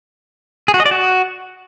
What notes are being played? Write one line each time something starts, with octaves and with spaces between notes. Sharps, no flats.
G#4
F#4
D#5
D5
F#4